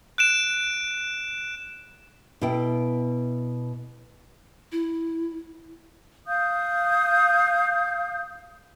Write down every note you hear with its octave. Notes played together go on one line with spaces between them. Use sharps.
F#6 D7 E7
B2 E4 G5
E4
F5 D#6 G6